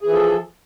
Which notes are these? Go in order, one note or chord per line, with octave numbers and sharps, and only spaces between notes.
E3 F3 G#4 A4